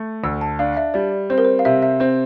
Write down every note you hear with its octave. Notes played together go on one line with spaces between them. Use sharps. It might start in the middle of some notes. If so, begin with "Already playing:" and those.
Already playing: A3
D2 E6
A5
D4 F5
E5
G3 D5
C4 C5
A#4
C5
F5
C3 E5
E5
C4 C5